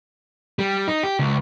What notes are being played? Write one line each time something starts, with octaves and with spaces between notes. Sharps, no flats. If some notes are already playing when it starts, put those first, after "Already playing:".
G3
D#4
G4
C#2